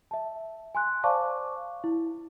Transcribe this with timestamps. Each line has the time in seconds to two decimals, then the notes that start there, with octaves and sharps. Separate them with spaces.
0.11 E5 A5
0.75 G#5 C6 F#6
1.04 C5 D5 F5 A5 C#6 D6
1.84 E4